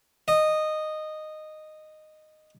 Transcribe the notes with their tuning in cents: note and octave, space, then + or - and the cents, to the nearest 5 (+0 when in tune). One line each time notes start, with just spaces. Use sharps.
D#5 -10